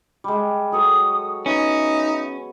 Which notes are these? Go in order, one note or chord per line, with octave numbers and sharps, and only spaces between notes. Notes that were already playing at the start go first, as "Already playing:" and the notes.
G3 G#3
F#3 A4 C#5 D#6
B3 C#4 D#4 E5